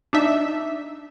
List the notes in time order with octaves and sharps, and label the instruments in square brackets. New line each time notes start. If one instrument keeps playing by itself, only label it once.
[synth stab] D4 D#4 E5